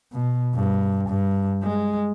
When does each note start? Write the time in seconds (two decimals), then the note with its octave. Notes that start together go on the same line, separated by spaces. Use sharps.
0.12 B2
0.54 G2
1.09 G2
1.63 G#3